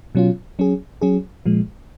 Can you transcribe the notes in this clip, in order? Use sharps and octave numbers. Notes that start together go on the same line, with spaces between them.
B2 F#3 C#4 F4
F#3 C#4 G#4
F#3 C#4 G#4
A#2 F3 G#3